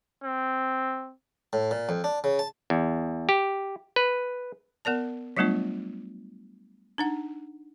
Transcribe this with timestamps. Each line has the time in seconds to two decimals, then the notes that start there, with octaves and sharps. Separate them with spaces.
0.24 C4
1.53 A2
1.71 A#2
1.89 F2
2.04 D4
2.24 C#3
2.39 A5
2.70 E2
3.29 G4
3.96 B4
4.85 B3 A#4 D5 A5
5.37 F#3 G3 A3 B3 D4 F4
6.98 D4 D#4 F#5